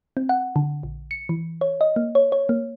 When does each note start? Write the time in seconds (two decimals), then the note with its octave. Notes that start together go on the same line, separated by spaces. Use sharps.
0.17 C4
0.29 F#5
0.56 D3
0.83 A#1
1.11 C#7
1.29 E3
1.61 C#5
1.81 D#5
1.96 A#3
2.15 C#5
2.32 C#5
2.49 A#3